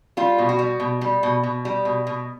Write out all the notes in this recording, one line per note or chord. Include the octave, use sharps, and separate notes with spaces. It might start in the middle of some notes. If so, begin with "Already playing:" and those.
G3 F4
B2
F#4
G3
B2
G3
B2
B2
G3
B2
B2